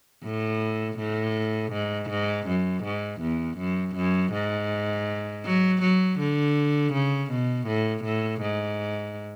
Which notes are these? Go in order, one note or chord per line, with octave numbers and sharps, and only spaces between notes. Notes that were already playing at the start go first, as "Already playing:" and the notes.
A2
A2
G#2
G#2
F#2
G#2
E2
F#2
F#2
G#2
F#3
F#3
D3
C#3
B2
A2
A2
G#2